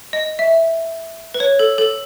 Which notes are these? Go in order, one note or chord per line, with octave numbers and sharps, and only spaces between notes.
D#5
E5
B4
C#5
A4
A4